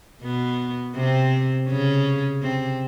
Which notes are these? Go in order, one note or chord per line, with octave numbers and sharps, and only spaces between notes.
B2 B3
C3 C4
C#3 C#4
C3 C4